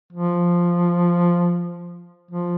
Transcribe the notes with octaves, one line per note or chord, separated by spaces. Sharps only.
F3
F3